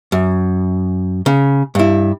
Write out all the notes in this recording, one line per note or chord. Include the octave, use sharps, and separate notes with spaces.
F#2
C#3
G2 E4